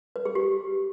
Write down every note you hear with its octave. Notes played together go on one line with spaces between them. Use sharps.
B4
G#4
G4